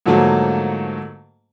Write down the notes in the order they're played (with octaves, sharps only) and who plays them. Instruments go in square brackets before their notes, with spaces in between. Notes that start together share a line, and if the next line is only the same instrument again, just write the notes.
[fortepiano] G#2 D3 F3 F#3 A3 A#3